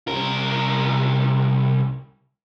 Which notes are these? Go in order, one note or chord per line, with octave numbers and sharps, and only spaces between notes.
C2 A#4